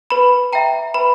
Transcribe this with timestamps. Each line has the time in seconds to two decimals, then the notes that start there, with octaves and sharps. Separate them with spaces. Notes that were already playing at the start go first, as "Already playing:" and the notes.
0.10 B4 B5
0.53 E5 G5 A#5
0.94 B4 B5